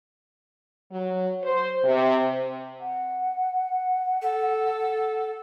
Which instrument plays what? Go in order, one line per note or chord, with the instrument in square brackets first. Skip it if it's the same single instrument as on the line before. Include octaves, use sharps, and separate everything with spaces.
[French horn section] F#3
C5
C3
[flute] F#5
[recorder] A4